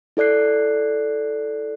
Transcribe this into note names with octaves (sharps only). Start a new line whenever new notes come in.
E4 A4 D5 F#6 C7